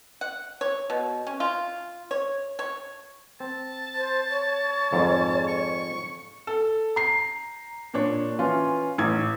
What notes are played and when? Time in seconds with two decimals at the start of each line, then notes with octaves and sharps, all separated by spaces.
0.21 F#5
0.61 C#5
0.90 B2
1.27 C#4
1.40 F4
2.11 C#5
2.59 C#5
3.40 C4 A5
3.95 C5
4.29 C#5
4.93 F2 G#2
5.47 C#6
6.47 A4
6.96 A#5 C7
7.94 A#2 D4 C#5
8.39 E3 C#4 F4
8.98 A1 G#6